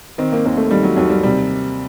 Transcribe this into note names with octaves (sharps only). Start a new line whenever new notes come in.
D#3 C4
A#3
D#2 A#3
A3
D#3 G3
F#3
D#2 F#3
G3
C3 G3